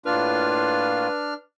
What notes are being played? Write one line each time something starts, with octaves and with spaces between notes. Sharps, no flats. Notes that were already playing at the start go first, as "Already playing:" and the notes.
A2 A#3 D4 F4 B4 F6